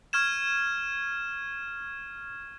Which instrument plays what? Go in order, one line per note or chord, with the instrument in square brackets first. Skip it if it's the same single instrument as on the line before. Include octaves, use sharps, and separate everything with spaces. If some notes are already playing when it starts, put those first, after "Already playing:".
[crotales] C#6 F6 G#6 E7